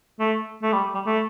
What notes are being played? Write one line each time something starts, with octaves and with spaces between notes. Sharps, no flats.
A3
A3
G3
G3
A3